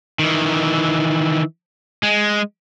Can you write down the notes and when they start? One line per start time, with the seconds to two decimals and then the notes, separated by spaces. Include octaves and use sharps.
0.19 D#3 E3
2.03 G#3